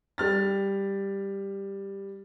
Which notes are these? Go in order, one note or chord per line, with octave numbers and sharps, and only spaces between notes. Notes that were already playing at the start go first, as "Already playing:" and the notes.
G3 F6 A6